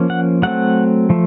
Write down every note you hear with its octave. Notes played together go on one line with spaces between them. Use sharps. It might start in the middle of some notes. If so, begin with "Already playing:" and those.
Already playing: F3 A#3 C#4
F#5
F#3 A3 C4 F#5
F3 A3